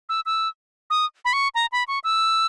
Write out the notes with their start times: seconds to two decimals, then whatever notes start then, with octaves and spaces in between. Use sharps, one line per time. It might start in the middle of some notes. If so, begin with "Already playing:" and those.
0.09 E6
0.26 E6
0.90 D#6
1.25 B5
1.33 C#6
1.55 A#5
1.72 B5
1.88 C#6
2.04 E6